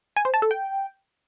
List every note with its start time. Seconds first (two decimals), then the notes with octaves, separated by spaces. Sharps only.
0.16 G#5
0.25 C5
0.34 A5
0.42 A4
0.51 G5